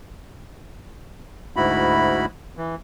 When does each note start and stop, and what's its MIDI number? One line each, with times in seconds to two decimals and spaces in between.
1.56 2.25 38
1.56 2.25 44
1.56 2.25 64
1.56 2.25 66
1.56 2.25 83
2.57 2.75 52